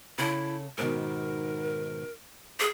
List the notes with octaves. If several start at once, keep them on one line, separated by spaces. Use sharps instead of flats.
C#3 E4 A4
G#2 B2 D#3 A#4
G#4